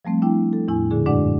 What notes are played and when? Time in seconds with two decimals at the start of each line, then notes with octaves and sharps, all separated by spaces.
0.05 F3 G3 A3 C4
0.22 D4 E4 G5
0.53 A4
0.68 E2 A2 E4 G#5
0.91 A#2 D3 G#4
1.06 F#2 G#3 D4 D5 F#5